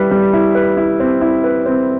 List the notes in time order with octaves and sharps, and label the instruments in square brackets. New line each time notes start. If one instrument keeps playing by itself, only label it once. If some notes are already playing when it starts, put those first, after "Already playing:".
Already playing: [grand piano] G3 E4 B4
G3
E4
B4
E4
C4
E4
B4
C4